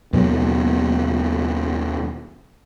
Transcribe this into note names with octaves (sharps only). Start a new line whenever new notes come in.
D#2 B2 F#3